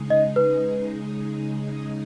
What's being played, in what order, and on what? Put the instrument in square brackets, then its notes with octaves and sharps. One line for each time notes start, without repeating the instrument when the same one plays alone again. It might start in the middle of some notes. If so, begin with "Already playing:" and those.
Already playing: [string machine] C#3 G#3 D#4 G#4
[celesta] D#5
B4